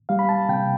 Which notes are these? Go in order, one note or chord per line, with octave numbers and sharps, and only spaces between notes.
G3 F5
B5
A5
C3 G5